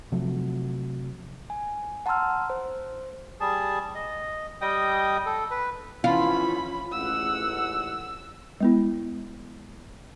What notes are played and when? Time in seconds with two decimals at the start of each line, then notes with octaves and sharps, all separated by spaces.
0.12 C3 F3 F#3 A3
1.50 G#5
2.06 F#5 A5 A#5 C6 E6 F6
2.50 C5
3.40 G3 G#4 A5
3.95 D#5
4.61 G3 D#5 G5 D#6
5.26 A4
5.51 B4
6.04 E3 F3 A3 C#4 F4 B5
6.92 A1 G#2 F#5 E6
8.61 G#3 B3 E4